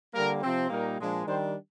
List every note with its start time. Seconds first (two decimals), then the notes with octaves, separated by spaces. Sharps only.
0.13 D3 G3 A#3 A#4
0.41 C3 F3 C4
0.69 A#2 G3 A#3 D#4 A#4
0.98 A#2 F3 G#3 D4
1.26 D#3 G3 D4 C5